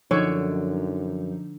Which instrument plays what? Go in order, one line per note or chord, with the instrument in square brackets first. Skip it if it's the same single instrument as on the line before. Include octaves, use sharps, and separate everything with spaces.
[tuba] F#2 [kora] D3 [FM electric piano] F3 D#4 [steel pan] C#5